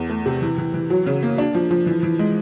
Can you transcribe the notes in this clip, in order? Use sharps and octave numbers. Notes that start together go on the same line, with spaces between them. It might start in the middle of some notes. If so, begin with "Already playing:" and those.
Already playing: E2
A3
C3
E3
E3
E3
F#3
C#3
A#3
D4
F3
F3
E3
E3
G#3